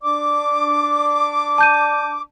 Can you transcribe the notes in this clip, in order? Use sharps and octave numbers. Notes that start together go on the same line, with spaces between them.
D4 D5 D6
A5 G6 D#7